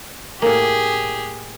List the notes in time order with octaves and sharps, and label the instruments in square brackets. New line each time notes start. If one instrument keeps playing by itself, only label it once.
[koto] A2 A#3 [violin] G4 G#4